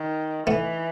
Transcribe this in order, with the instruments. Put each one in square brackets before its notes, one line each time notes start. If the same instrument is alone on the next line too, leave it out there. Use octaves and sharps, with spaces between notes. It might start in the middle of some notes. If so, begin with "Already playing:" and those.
Already playing: [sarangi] D#3
[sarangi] E3 [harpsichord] A3 B3